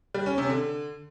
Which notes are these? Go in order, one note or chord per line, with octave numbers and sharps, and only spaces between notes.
G3
C#4
C3
D3